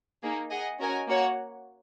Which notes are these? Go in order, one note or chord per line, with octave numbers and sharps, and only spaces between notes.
A#3 D#4 G#4
G#4 D#5 F#5
C#4 F#4 A#4 D#5 G#5
A#3 F#4 C#5 F#5